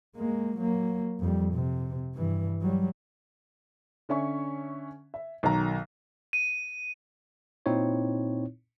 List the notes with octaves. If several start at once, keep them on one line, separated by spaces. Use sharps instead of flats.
G#3 A#3
F#3 A#3
F2 G3
C3
G2 E3
F#3 G3
D3 C#4 E5 C#6
E5
B1 D#3 F#3 A#5
D#7
A#2 C4 D#4 E4 C#5